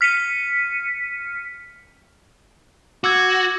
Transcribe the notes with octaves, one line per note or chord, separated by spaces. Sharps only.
F6 B6 C#7 D#7
F#4 D6 E6 G#6